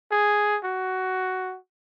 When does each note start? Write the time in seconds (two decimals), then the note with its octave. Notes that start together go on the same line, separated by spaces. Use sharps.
0.11 G#4
0.64 F#4